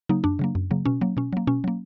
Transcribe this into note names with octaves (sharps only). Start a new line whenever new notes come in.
C#3 F#3 A#3 D#4
F#2 D4
C#3 F#3 A#3
F#2
C#3 F#3 A#3
B2 C#4
F#3 A#3
B2 C#4
F#3 A#3
B2 C#4
F#3 A#3